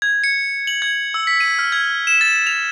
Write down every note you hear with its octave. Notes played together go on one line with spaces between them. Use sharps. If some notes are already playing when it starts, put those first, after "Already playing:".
G#6
C#7
F#7
G#6
E6
B6
D#7
F6
G#6
E7
A6
F7